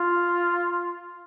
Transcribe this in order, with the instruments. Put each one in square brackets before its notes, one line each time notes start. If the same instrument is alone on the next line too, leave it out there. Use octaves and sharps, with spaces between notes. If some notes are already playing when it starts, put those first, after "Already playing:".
Already playing: [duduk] F4